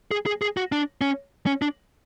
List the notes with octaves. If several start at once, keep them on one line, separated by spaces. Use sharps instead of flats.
G#4
G#4
G#4
F#4
D4
C#4
C#4
D4